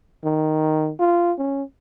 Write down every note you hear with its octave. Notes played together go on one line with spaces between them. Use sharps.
D#3
F4
C#4